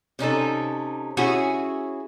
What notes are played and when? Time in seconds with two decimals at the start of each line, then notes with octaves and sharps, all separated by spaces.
0.19 C3 C#4 D#4 A4
1.17 C#4 E4 F#4 G#4 C#5